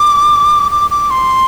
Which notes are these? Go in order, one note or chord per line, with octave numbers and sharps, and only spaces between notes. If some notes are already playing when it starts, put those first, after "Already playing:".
Already playing: D6
D6
D6
C6